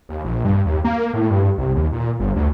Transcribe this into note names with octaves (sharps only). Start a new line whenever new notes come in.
D#2
A#1
G2
D#2
A#3
A2
G2
C2
D#2
A#2
G1
D2